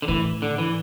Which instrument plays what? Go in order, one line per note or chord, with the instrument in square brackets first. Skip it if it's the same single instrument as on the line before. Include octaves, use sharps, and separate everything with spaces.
[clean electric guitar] D3
[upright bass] A2 [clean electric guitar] E3
[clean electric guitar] D3
E3